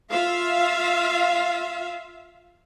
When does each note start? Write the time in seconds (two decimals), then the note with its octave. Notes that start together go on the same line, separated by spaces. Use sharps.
0.11 F4 E5 F5